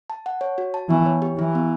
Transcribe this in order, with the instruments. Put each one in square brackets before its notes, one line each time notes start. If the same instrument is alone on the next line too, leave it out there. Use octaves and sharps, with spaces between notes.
[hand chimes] A5
F#5
C#5
F#4
A5
[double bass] E3 [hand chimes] B3
[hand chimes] C#5
G4
[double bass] E3 [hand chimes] E4
[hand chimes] B3